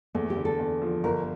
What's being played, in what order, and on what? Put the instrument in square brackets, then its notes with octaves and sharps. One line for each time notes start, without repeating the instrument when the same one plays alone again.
[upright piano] E2 [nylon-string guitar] A3
[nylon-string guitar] G4
[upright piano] D3
[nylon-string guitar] A4
[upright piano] E2
F3
[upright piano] G1 [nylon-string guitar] A#4